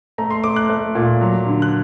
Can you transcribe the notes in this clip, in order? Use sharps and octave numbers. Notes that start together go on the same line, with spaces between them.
A3 A#5
C6
A3 D6
F#6
A3
A#2
F#3
D3
F#6